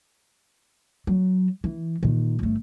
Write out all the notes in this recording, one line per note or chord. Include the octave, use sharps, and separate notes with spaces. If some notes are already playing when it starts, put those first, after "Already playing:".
F#3
E3
A#2 D#3
G1 A3